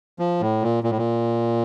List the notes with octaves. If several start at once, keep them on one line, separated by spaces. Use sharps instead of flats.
F3
A2
A#2
A#2
A2
A#2